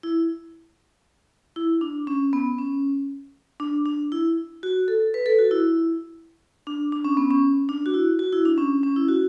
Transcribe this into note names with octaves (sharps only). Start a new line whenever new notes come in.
E4
E4
D4
C#4
B3
C#4
D4
D4
E4
F#4
A4
B4
A4
F#4
E4
D4
D4
C#4
B3
C#4
D4
F#4
E4
F#4
E4
D4
C#4
C#4
E4
F#4